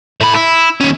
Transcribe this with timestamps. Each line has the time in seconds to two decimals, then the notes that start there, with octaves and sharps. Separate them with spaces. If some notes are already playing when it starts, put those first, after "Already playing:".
0.21 A2 B5
0.35 E4
0.81 D#2 C#4